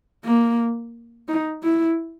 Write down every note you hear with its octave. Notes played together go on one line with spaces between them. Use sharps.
A#3
D#4
E4